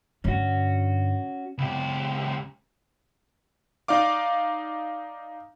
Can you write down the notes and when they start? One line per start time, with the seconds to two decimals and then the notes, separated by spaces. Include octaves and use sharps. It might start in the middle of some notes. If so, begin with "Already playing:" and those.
0.24 G2 D3 C#4 F#4
1.58 C#2 G4
3.88 D#4 D5 F5 D6